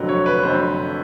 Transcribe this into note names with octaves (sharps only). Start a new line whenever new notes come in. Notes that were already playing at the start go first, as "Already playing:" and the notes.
Already playing: F1 F2 D3 F#3
C#5
B4
F1 F2 D3 F#3 C5